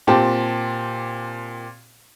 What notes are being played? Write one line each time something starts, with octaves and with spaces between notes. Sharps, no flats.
A#2 C4 G4 A5